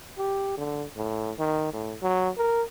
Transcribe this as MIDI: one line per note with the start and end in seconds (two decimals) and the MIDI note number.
0.18 0.53 67
0.57 0.84 50
0.96 1.31 45
1.39 1.72 51
1.73 1.96 45
2.02 2.29 54
2.37 2.62 70